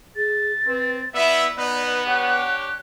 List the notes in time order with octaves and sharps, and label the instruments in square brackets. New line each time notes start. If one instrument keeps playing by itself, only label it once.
[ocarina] G#4 [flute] A6
[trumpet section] C4 [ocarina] B4
[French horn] B3 [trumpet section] E4 E5 [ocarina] D5
[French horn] B3 [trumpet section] D#4 B4 [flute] F#6
[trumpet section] D4 G4 C#5 [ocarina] F#5